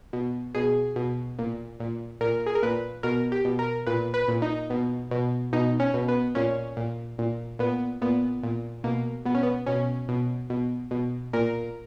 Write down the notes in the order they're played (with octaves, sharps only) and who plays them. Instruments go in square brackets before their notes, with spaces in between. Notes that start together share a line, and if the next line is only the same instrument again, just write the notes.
[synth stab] B2
B2 G#4
B2
A#2
A#2
A#2 A#4
G#4
A#4
A#2 B4
B2 A#4
G4
B2
A#4
A#2 B4
B4
A#2
D#4
B2
B2
B2 D#4
C#4
B2
B3
A#2 C#4
A#2
A#2
A#2 B3
A#2 B3
A#2
B2 A#3
B2 B3
C#4
B3
B2 C#4
B2
B2
B2
A#2 A#4